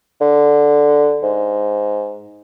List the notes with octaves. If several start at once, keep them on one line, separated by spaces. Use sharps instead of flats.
D3
G#2